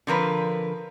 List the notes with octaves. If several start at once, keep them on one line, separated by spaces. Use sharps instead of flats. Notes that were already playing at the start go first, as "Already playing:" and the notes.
D3 F3 A#4 B4